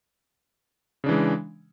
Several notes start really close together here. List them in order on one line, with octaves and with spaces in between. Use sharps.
C#3 D4 E3 G#3